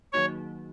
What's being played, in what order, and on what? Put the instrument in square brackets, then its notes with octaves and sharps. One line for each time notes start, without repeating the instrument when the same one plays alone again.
[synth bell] D#3 F#3 A#3 D#4 F#4 [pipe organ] C#5